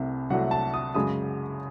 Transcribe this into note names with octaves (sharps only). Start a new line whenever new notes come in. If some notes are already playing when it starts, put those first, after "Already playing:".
Already playing: C2 C3 A3
C2 C3 F#3 A3 F#5
A5
D#6
F#2 C#3 G#3 D#6